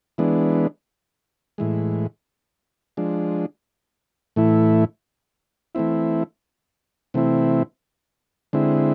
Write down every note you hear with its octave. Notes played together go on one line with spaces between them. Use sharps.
E3 G#3 B3 D4
A2 E3 G#3
F3 G#3 D4
A2 E3 A3 E4
E3 A3 C4 E4
C3 E3 A3 C4 E4
D3 G#3 C4 E4